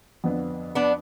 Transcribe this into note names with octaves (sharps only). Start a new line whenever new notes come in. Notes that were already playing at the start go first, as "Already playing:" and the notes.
F2 D3 F3 B3 D4
B3 D4